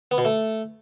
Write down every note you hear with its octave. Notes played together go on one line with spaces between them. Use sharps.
B3
B2
A3